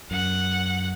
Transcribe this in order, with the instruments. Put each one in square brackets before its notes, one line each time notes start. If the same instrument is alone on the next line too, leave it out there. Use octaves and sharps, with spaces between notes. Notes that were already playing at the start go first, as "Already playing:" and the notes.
[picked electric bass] F#2 [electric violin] F#5